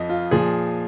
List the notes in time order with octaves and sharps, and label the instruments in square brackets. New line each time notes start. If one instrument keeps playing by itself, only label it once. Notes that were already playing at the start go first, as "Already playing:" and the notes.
Already playing: [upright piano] F2 F3 D#5
F4
A#2 F3 G#4